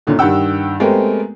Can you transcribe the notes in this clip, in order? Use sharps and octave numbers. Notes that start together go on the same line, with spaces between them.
F#2 A#2 D3 D#3
G2 D#3 G4 F#5 G5 E6
G#3 A3 B3 C4 G4 A#4